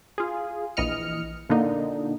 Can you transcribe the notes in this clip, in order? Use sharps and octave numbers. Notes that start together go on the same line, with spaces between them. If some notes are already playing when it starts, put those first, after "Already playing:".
F4 G#4
A#1 E3 D#5 F6 C#7
A#2 D3 A#3 D4 D#4